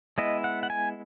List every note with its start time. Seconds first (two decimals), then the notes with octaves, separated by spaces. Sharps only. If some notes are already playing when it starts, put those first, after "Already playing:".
0.18 G#3 B3 E4 D#5
0.44 F#5
0.63 F#5
0.70 G#5